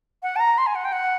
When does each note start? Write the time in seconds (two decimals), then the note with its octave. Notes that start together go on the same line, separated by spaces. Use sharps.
0.23 F#5
0.36 A5
0.40 A#5
0.58 C6
0.67 G#5
0.75 F#5
0.85 G5
0.93 F#5